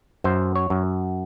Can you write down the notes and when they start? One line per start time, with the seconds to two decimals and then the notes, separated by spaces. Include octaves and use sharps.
0.24 F#2 C5
0.55 C#5
0.70 F#2